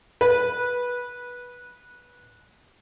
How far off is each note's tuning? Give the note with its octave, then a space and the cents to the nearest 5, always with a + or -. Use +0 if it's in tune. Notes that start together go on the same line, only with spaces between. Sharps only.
B4 -15